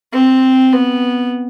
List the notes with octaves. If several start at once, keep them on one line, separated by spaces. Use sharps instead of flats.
C4
B3